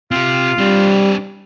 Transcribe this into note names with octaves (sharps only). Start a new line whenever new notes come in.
C4 F4 G4
G3 C4 D4